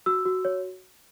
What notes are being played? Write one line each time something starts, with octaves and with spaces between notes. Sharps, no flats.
F#4 E6
F#4
C#5